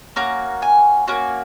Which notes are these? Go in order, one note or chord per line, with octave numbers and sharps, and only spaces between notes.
A#3 C#4 F#4 A#5
G#5
A#3 C#4 F#4